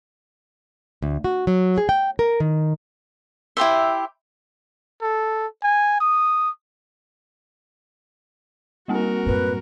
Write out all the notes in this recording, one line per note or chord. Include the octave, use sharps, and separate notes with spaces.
D2
F#4
F#3
G#4
G5
A#4
D#3
E4 G4 C5 E5
A4
G#5
D#6
G3 A#3 C4 F#4 A#4
F#2 A2 B4